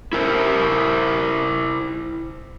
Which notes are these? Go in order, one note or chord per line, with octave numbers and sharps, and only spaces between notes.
E4 A#4 C5